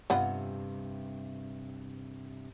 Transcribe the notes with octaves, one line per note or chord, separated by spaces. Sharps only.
G2 C3 B3 F4 F#5